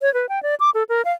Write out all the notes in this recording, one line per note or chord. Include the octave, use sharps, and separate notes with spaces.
C#5
B4
G5
D5
D6
A4
A#4
F5